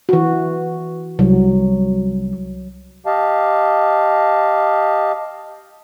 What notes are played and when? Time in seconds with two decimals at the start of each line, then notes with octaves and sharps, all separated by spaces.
0.09 E3 F#4
1.19 C2 F#3
3.06 G4 D#5 F5 A5